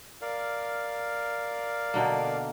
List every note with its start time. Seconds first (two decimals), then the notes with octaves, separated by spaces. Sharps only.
0.22 A#4 D5 F5
1.94 B2 D3 A#3